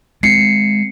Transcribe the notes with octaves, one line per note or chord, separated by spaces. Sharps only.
G#3 C4 C7 C#7